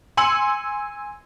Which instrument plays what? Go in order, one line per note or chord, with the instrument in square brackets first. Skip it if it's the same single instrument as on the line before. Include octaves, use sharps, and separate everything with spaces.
[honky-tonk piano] G#5 C6 E6 C#7 F#7